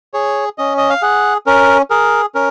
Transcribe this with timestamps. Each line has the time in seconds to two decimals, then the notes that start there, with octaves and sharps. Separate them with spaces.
0.14 G#4 C#5
0.58 C#4 D#5
0.78 D#5
0.90 F5
1.02 G#4 F#5
1.47 C#4 A#4
1.90 G#4 A#4
2.35 C#4 A#4